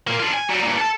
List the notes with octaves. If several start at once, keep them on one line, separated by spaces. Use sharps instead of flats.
A#2 A#3
D4 F4
G#5
F#3 G3
G2 A#2
A4 A5